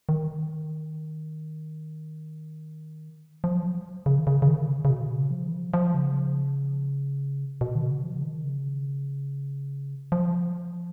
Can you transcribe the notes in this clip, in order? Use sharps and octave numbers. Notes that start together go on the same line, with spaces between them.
D#3
F3
F#3
F3
C#3
D#3
C#3
C#3
D#3
C#3
C#3
B2
C#3
F3
D#3
F3
F3
C#3
B2
D#3
C#3
F3
C#3
D#3
C#3
F3